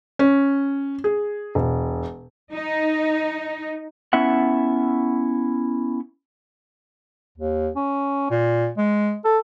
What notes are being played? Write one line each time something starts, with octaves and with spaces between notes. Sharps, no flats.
C#4
G#4
E1
D#4
B3 C#4 E4 E5 F#5
D#2
C#4
A#2
G#3
A4